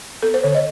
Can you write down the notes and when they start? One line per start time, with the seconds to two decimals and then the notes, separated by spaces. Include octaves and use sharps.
0.23 B3 A4
0.34 C5
0.43 D3 C#5
0.55 D#5